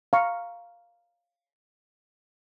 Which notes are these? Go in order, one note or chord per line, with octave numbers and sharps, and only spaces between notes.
F5 A#5 C#6